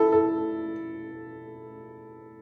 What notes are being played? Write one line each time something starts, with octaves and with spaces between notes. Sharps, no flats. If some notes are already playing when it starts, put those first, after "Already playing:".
Already playing: E4 A4
A4